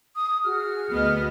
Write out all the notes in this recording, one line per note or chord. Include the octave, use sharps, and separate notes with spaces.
D#6
F#4 G#4 F6
D2 B3 D#5